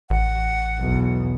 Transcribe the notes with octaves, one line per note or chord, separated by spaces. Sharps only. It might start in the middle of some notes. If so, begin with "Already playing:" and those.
A1 F#5
B1 E2